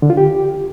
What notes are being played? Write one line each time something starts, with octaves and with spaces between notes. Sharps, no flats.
D3
F4
G4